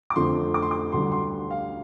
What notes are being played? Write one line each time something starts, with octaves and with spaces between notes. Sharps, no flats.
D6
F2 D3 F3 A3 C4 C6
D6
C6
D6
D2 D3 G3 C6
C6
F5